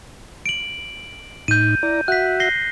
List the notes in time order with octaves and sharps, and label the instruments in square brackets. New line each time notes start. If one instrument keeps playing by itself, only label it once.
[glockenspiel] D7 F#7
[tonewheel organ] A2 D#4 [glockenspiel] G6 D#7
[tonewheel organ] E4 D5 A#5
[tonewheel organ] F#4 E5 F#5 [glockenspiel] F#6 B6
[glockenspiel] A#6 C7 G7